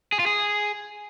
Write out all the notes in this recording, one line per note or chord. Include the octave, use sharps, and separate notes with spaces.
G#4
F4
G#4